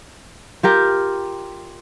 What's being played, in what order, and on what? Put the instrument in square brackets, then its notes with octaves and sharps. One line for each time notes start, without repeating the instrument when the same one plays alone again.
[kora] F4 G4 A#4 G5